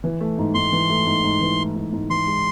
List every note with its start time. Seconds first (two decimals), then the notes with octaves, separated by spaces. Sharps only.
0.04 E3
0.20 A3
0.38 G#2
0.55 G#2 C6
0.72 E3
0.89 A3
1.06 G#2
1.24 G#2
1.41 E3
1.59 A3
1.75 G#2
1.92 G#2
2.10 E3 C6
2.27 G#3